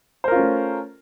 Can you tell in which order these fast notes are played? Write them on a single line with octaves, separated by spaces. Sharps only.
C5 A#4 F4 C#4 A3